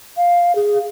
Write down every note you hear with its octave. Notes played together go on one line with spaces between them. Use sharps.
F5
G#4